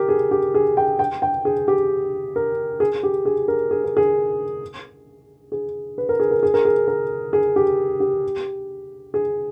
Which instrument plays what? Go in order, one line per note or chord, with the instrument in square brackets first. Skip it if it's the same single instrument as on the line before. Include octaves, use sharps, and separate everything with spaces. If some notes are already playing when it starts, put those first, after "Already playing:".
Already playing: [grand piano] G4 A#4
G#4
G4
G#4
G5
G5
G5
G#4
G4
A#4
G#4
G4
G#4
A#4
G#4
A#4
G#4
G#4
B4
A#4
G#4
A#4
G#4
A#4
G#4
A#4
G#4
G4
G4
G#4